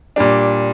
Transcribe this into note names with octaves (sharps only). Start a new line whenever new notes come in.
A#2 G3 D4